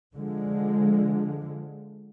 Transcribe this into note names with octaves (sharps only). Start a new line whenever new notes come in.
D3 F3 G#3